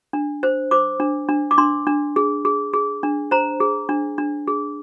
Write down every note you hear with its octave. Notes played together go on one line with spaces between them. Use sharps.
D4
C5
C5 D6
D4
D4
D6
D4 C6
D4
G#4
G#4
G#4
D4
C5 A#5
G#4
D4
D4
G#4